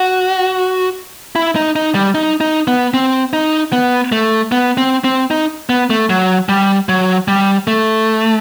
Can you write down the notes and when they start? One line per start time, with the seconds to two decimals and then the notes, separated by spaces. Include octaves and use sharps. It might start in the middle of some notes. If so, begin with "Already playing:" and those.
Already playing: F#4
1.36 E4
1.56 D#4
1.76 D#4
1.95 G3
2.15 D#4
2.41 D#4
2.68 B3
2.94 C4
3.33 D#4
3.73 B3
4.12 A3
4.52 B3
4.78 C4
5.04 C4
5.31 D#4
5.69 B3
5.90 A3
6.10 F#3
6.49 G3
6.89 F#3
7.28 G3
7.67 A3